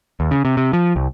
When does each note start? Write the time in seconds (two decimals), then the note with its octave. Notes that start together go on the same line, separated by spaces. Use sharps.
0.20 D#2
0.31 C#3
0.45 C3
0.57 C3
0.73 F3
0.96 C2